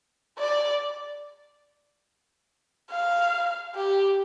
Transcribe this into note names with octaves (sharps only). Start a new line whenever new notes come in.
D5
F5
G4